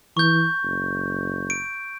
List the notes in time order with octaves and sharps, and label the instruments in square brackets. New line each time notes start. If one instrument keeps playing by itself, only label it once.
[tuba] E3 [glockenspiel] C#6 G6
[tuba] F#1
[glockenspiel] D7